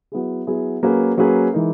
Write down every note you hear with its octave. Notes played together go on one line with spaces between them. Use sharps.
F#3 B3 E4 G#4
F#3 B3 E4 G#4
F#3 A#3 C#4 G#4 B4
F#3 A#3 C#4 G#4 B4
E3 G#3 D#4 A#4